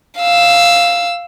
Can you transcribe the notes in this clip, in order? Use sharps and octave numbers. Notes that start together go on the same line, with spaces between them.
F5 E6